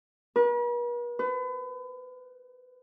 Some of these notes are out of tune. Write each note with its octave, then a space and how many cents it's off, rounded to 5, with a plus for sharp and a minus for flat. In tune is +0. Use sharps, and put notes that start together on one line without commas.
B4 -45
B4 +35